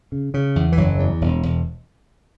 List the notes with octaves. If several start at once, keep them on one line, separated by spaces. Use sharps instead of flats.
C#3
C#3
E2
E3
F#1 F#3
E2
E1
E1